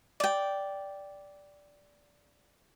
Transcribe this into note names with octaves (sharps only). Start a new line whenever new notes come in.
D5 G5